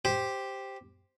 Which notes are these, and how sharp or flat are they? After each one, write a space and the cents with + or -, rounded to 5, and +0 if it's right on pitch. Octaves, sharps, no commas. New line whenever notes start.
G4 +0 C5 +0